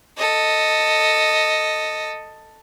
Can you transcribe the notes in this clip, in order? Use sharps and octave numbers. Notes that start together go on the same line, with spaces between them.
A4 D#5